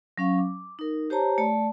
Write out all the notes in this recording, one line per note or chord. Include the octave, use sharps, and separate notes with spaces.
F#3 C#4 F5 C#6
D6
D#4 A#4
G4 C5 C#5 A5 A#5
A3 D5 A5